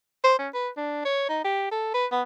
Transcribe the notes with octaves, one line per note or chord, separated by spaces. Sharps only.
C5
C#4
B4
D4
C#5
D#4
G4
A4
B4
B3